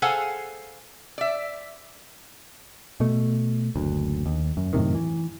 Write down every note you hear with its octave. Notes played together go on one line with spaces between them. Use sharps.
G#4 A4 C5 F5 F#5 G#5
D5 E5
B2 A3
F#1 D2
D#2
F#2
F#2 A2 C3 D#3
E3